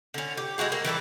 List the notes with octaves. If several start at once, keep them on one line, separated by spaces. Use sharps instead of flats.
D3 C#4
G4
G#3 E4 F#4 G#4
A#3
E3 G3 E4 A4